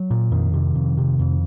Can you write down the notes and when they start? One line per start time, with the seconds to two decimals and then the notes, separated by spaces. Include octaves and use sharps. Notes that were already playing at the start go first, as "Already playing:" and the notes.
Already playing: F#3
0.11 A#2
0.31 F2 D#3
0.54 C3
0.75 F2
0.97 C3
1.19 F2